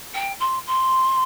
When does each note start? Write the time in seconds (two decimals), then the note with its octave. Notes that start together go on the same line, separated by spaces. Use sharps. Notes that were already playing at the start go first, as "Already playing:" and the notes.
0.14 G5
0.39 C6
0.66 C6